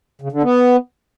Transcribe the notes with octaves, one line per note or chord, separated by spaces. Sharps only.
C#3
D3
B3